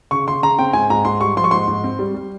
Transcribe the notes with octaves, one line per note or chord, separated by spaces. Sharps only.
C#3 C#6
C#3 C6
C#3 A#5
C4 G5
G#2 G#5
G#2 A#5
G#2 C6
G3 C#6
F3 C6
C#6
G#2 C6
G#2
C4
G3
G3